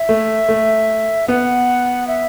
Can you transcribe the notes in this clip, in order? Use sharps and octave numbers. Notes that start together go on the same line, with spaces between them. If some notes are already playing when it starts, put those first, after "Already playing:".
Already playing: E5
A3
A3
B3 F#5
E5